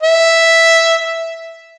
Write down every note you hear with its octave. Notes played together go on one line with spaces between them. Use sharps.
E5